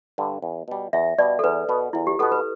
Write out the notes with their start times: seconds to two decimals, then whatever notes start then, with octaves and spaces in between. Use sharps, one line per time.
0.18 G2 D3
0.42 E2
0.68 B2 G3
0.93 E2 E5
1.18 B2 G3 D5
1.39 A4
1.44 E2 B4
1.69 B2 B3
1.93 E2 E4
2.07 G4
2.19 B2 B3 A4
2.32 B4